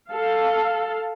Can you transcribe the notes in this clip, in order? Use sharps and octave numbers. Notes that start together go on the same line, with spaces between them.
A4 F5